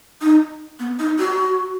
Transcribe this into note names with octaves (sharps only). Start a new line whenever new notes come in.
D#4
B3
D#4
F#4